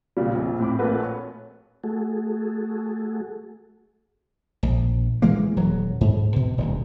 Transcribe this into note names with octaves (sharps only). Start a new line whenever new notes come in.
B1 A#2 C#3 G3
A#1 F2
A2 C4 B5 D6
A#1 A3 A#3 C4 F#4 B4
C#5
A3 F#4 G#4 A4
A#1
E3 G#3 A#3
D#1 F#3
G#2
B2
D#1 D2